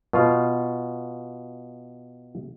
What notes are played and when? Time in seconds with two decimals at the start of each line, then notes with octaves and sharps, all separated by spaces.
0.13 B2 F4 F5